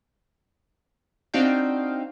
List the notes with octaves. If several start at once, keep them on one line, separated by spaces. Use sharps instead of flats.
C4 D4 D#4 F#4 F5 G5